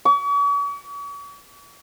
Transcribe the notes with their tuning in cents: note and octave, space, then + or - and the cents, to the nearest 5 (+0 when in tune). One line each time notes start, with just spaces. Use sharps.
C#6 +45